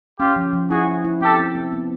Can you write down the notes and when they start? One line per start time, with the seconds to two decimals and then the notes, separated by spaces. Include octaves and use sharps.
0.19 C#4 F4 G4
0.36 F3
0.53 F3
0.70 E4 F#4 G#4
0.87 E4
1.05 E4
1.21 C4 G4 A4
1.39 C4
1.55 C4
1.73 B3